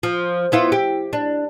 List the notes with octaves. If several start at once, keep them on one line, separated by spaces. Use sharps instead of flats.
F3
B3 E4 F4
G4
D4